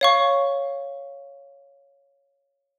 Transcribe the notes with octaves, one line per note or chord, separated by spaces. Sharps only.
C#5 F5 C#6